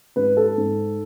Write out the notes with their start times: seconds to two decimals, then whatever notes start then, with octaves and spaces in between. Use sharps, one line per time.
0.16 G#2 B4
0.37 A4
0.58 G#2